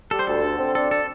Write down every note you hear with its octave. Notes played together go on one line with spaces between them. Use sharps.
G3 A4
C5
D2 A4
D3
C4
D4 A4
A4